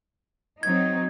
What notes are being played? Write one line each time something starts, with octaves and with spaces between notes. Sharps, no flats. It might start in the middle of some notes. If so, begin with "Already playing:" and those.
F#3 C4 D#4 G#6